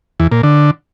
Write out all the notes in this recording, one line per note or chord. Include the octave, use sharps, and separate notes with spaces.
E2
A#2
D3